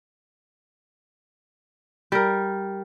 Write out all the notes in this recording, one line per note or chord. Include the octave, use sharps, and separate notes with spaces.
G3 A#4